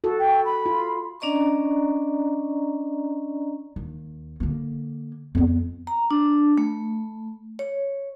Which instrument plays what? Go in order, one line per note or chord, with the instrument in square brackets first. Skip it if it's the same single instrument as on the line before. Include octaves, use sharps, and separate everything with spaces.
[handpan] F#4 A4
[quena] G5
B5
[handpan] F4
[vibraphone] C#4 D4 D5 D#5 A#5 C#6
[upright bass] D#2
D3 A#3
F2 B3
[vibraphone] A#5
D4
A3
C#5